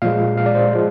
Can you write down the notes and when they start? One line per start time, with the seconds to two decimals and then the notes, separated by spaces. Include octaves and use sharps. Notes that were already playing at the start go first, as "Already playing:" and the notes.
0.02 A#2 F3 G#3 F5
0.37 F5
0.46 D5
0.55 C5
0.72 F3 G#3